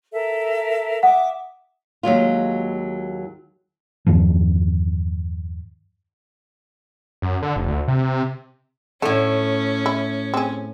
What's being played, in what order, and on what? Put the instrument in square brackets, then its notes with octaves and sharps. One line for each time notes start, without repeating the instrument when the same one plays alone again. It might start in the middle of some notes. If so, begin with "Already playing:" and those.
[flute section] A4 A#4 E5
[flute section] E5 D6 D#6 [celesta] F#5
[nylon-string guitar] D#2 F#3 G#3 F4
[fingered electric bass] E2 G2 D#3 F3
[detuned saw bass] F#2
D3
F1
D2
C3
C3
[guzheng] A2 A3 [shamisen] D3 [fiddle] C#4
[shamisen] E4
C4 G#4